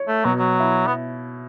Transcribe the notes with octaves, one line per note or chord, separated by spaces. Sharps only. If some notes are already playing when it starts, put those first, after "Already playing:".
Already playing: C#5
A3
B2 F#3
F#3
E4
B3